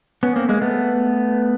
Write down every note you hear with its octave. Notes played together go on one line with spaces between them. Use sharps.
B3 C#4
A#3 C4
G#3 A#3
A3 B3